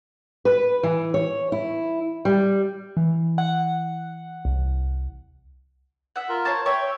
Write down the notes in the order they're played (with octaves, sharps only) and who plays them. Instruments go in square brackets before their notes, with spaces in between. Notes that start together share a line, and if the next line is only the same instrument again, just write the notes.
[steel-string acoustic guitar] B4
E3
C#5
E4
G3
[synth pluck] E3
F#5
C2
[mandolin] E5 F#5
[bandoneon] F4 A#4
[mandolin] C5 C#5 A5
[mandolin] C#5 [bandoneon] E5 G5